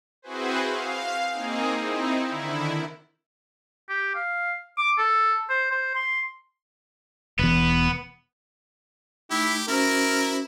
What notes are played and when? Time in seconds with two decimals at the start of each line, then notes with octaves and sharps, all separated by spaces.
0.22 C4 E4 F#4 G#4 B4 C5
0.64 F5
1.33 A#3 C4 D#4 G#4
1.80 C4 D#4 E4
2.29 D3 D#3 E4
3.89 G4
4.15 F5
4.78 D6
4.98 A4
5.50 C5
5.71 C5
5.95 C6
7.39 E1 E2 B3
9.31 A3 D#4 E4 G4
9.68 C#4 E4 F#4 A#4 C5